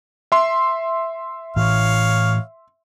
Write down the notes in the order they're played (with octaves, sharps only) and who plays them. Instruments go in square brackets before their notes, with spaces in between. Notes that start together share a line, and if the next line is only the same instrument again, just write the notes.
[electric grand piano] E5 C6
[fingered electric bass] A2 E3 [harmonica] C#5 F5